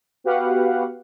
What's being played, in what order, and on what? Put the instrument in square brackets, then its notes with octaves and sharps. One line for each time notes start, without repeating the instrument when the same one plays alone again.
[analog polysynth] B3 F#4 G4 B4 F5 F#5